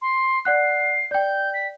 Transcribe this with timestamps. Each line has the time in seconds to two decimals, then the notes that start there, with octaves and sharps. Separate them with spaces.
0.02 C6
0.45 D5 F#5 F#6 C7
1.11 D5 G5 G6
1.54 B6